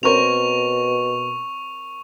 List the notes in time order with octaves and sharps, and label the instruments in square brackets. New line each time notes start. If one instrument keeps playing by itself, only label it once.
[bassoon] B2 [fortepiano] C4 A#4 C#5 [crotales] C#6 F7